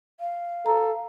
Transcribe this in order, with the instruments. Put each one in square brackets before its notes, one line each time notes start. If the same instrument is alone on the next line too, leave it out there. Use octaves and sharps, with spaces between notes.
[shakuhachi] F5
[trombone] A4 [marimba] A#5